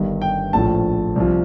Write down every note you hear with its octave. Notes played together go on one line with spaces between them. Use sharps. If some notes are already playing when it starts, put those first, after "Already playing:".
Already playing: G1 G2 D#3
G5
A#1 A2 F3 A5
C2 C3 F3